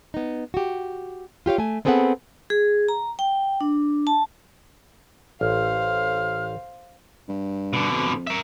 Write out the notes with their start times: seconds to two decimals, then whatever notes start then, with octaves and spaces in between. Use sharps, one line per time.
0.14 B3 D#4
0.54 F#4 G4
1.46 F4 G4 C#5 F5
1.58 A3 G#5
1.85 B3 C4 G#4 A4 B4 F#5
2.50 G#4
2.88 A#5
3.19 G5
3.61 D4
4.07 A5
5.41 A1 C5 F5 F6
7.28 G2
7.73 B2 D3
7.92 F2
8.27 A#4 E5